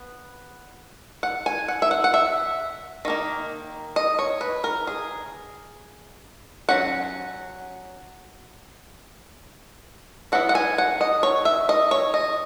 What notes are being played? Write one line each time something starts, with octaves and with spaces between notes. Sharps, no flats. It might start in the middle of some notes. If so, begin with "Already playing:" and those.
Already playing: B3
F#5
G#5
F#5
E5
F#5
F#5
E5
D#3 A#3 D#4
D#5
C#5
B4
A#4
G#4
F#3 C#4 F#5
F#3 B3 E4 F#5
F#5
G#5
F#5
D#5
C#5
E5
D#5
C#5
D#5